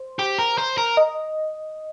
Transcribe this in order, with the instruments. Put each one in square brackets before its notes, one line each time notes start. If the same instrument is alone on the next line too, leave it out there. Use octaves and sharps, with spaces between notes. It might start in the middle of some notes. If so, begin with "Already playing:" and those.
Already playing: [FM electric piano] C5
[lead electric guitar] G4
A#4
C5
A#4
[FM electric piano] D#5